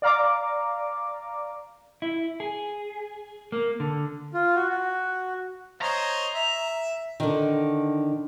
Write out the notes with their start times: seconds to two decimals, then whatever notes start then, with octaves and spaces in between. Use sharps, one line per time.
0.02 D5 F5 A#5 D6
2.02 E4
2.40 G#4
3.52 A#3
3.80 D3
4.34 F4
4.56 F#4
4.69 F#4
5.82 C5 C#5 D#5 A#5
6.34 E5
7.20 D3 D#3